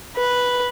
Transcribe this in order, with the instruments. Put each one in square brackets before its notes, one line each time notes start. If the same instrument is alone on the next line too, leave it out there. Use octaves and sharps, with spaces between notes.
[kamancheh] B4